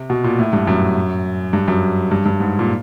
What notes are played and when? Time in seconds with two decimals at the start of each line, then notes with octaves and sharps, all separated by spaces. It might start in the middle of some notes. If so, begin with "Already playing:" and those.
Already playing: C3
0.10 B2
0.24 A#2
0.39 A2
0.53 G2
0.67 F#2
1.53 G2
1.68 F#2
2.11 G2
2.26 G2
2.40 G#2
2.59 A#2